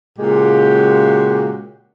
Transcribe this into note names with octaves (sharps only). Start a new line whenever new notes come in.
A#2 C#3 G#3 F#4 G4